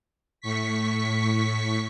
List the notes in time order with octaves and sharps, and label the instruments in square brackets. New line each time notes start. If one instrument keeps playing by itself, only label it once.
[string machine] A2 C#6 B6